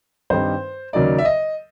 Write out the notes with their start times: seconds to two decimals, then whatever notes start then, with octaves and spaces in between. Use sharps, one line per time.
0.30 G2 D#3 G3 C4 D#4 C5
0.93 D#2 C#3 F#3 A#3 D#4 D5
1.18 E5
1.25 D#5